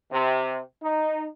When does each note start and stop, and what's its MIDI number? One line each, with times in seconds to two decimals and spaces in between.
0.12 0.60 48
0.83 1.26 63